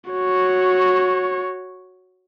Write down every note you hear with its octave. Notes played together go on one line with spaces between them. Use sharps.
F#4 C#5